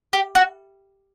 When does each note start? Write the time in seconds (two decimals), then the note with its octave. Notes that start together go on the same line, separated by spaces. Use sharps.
0.13 G4
0.35 F#4